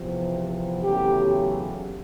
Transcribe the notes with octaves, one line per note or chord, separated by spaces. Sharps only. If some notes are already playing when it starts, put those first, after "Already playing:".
Already playing: E2 C3 F3
E2 C#3 F#3 A3 G4